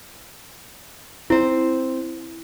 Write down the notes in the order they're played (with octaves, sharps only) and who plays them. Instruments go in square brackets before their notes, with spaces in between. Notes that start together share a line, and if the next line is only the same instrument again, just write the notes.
[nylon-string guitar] C4 C5 [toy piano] E4